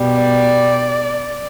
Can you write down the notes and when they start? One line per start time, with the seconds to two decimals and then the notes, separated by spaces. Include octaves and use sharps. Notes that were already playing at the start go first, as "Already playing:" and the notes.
Already playing: B2 G3
0.17 D5